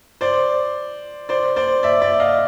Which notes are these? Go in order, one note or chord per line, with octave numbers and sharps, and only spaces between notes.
C5 D5
C5 D5
C5 D5
D5 E5
D5 E5
D#5 F5